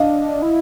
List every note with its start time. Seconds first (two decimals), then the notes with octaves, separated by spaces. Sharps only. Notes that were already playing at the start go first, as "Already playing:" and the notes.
Already playing: D4 D#5 F5
0.42 E4